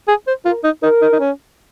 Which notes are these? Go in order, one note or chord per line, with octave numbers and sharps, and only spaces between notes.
G#4
C5
F4 A#4
D#4
D#4 A#4
D#4
D#4
C#4